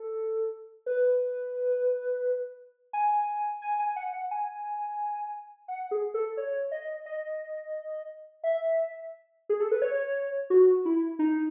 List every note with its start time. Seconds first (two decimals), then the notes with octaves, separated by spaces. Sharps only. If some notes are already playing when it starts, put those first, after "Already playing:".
Already playing: A4
0.86 B4
2.93 G#5
3.62 G#5
3.79 G#5
3.96 F#5
4.13 F#5
4.31 G#5
5.68 F#5
5.91 G#4
6.14 A4
6.37 C#5
6.71 D#5
7.06 D#5
8.44 E5
9.49 G#4
9.60 A4
9.71 B4
9.82 C#5
10.50 F#4
10.85 E4
11.19 D#4